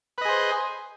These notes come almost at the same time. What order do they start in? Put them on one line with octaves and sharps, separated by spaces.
B4 D#5 G#4 C5